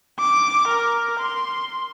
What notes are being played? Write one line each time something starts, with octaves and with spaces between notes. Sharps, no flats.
D6
A#4
C6